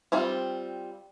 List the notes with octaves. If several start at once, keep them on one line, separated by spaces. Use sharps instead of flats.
G3 C4 F4